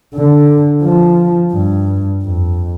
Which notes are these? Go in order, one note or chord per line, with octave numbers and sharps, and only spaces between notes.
D3
F3
G2
F2